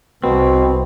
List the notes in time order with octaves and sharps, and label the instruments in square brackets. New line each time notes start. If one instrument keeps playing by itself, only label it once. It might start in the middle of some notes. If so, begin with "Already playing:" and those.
[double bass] C2 [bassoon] B2 [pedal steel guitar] C4